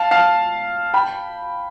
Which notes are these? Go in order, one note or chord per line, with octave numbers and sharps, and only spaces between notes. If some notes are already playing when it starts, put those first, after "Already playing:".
Already playing: F5 A5
F5 A5
G5 B5